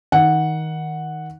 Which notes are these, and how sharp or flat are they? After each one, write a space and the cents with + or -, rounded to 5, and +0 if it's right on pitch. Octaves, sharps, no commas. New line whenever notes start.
D#3 +20 F#5 -5